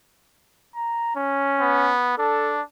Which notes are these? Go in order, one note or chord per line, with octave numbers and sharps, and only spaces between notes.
A#5
C#4
B3
D4 A4